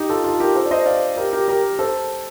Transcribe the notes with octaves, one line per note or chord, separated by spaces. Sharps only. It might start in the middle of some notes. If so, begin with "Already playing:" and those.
Already playing: D#4 G4
F4 A4
F4 A4
G4 A#4
A4 C5
D5
C5 D#5
D5 F5
G4 A#4
G4 A#4
G4 A#4
A4 C5